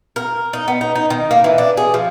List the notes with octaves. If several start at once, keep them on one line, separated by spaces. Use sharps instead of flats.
A#4
D#4
B3
D#4
D#4
D#3
A#3
E3
D4
G#4
F3